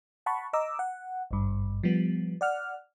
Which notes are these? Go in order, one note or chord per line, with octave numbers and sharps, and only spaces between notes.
F#5 A5 B5 C#6
D#5 A#5 D6 E6
F#5
G#1 G2
F3 G3 B3
D5 F#5 F6